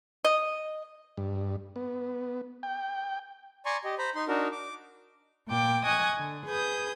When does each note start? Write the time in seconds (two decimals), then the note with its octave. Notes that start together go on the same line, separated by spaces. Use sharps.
0.24 D#5
1.17 G2
1.76 B3
2.63 G5
3.66 D5 G#5 A#5 C6 C#6
3.84 G4 D#5
3.99 C5 A#5 B5
4.15 D#4 C6
4.28 D4 D#4 F#4 A#4
4.52 D6
5.48 A#2 G5 D6
5.84 D#5 G#5 C#6 D#6 F#6
6.17 D3
6.46 G#4 B4 D#6 G6